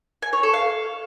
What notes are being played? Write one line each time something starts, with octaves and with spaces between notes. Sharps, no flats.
G#5
C#5
A4
F5